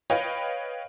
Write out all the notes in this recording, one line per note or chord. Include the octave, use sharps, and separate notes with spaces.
B4 C#5 D#5 F5 G5 B5